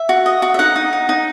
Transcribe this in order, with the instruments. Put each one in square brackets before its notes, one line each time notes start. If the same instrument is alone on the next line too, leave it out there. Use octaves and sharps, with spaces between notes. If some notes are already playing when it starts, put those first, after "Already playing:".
Already playing: [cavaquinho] E5
F#4
D#5
F#4
E5
D#4 F#5
D#4
D#4
D#4